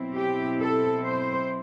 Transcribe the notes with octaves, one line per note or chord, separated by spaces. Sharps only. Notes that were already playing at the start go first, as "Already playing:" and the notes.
Already playing: B2 F#3 C4 E4
G4
A4
C5